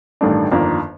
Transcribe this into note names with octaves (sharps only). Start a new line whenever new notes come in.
A1 G2 D#3 A3 D4
G1 F2 D#3 A#3 D4